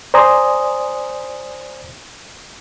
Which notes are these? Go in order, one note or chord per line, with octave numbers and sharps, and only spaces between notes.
C5 D5 G#5 A#5 D#6